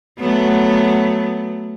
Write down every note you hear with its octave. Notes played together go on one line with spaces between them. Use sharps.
F#3 A3 B3